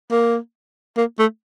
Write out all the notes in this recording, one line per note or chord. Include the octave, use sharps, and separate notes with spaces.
A#3
A#3
A3